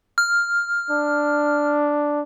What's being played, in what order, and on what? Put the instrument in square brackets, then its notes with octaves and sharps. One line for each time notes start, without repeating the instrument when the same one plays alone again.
[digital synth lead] F6
[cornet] D4